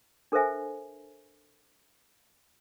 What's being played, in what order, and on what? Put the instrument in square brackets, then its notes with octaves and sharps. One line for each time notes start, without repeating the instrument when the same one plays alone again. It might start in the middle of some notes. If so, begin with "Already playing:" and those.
[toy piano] D4 A4 A#4 C5 E5 G#5